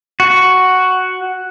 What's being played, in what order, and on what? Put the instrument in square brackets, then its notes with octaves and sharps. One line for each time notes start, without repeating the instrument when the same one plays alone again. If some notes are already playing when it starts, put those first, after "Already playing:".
[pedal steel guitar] F#4